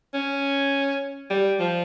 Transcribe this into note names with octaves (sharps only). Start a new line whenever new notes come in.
C#4
G3
F3